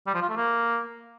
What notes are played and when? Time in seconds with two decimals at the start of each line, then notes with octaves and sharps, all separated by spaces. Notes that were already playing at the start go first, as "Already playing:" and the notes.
0.07 G3
0.15 F3
0.22 F4
0.29 A3
0.37 A#3